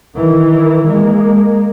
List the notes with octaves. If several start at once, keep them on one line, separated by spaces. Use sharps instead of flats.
D#3 E3
G#3 A#3